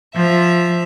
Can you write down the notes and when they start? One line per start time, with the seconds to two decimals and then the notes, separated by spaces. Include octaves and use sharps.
0.16 F3 E5